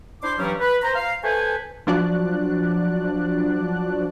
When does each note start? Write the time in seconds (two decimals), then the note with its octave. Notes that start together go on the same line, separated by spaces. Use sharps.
0.22 D4 E4 C5 C6 D6
0.39 G2 E3 F#3 G3 C#4
0.60 B4
0.82 C5 A#5
0.95 F5
1.23 A4 B4 C5 G#5
1.87 F3 F#3 D4 F#4 D5 F#6